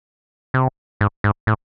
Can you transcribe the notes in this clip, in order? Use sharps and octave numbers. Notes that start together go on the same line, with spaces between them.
C3
G#2
G#2
A2